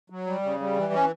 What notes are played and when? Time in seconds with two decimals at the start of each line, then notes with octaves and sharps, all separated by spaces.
0.10 F#3
0.26 G3
0.43 C#3
0.60 G3
0.76 E3
0.93 C#4